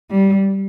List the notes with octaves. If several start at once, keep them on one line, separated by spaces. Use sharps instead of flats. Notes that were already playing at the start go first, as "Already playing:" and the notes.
G3